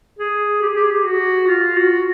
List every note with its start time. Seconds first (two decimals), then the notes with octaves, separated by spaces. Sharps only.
0.19 G#4
0.62 G4
0.68 G#4
0.76 G4
0.84 G#4
0.91 G4
1.04 F#4
1.47 F4
1.76 F#4